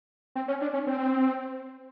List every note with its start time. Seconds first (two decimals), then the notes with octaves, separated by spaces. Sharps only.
0.35 C4
0.48 C#4
0.61 D4
0.73 C#4
0.87 C4